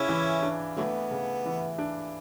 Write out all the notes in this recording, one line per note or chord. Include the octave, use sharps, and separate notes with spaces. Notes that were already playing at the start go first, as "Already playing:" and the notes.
Already playing: C#3 C#4 E4
E3
D4
D3 F#3 A3 B3
C#3
E3
D4